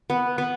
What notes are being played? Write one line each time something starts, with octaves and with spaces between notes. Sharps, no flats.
B3
B3